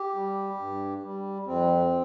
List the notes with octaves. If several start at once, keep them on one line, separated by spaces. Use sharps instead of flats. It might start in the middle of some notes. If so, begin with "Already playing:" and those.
Already playing: G4
G3
G2
G3
F2 C4